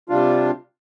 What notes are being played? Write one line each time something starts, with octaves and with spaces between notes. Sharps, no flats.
C3 G3 D4 F4